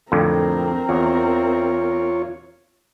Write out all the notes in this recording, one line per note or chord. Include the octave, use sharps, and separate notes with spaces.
F2 A2 D3 C4 A#4
E2 F4 C#5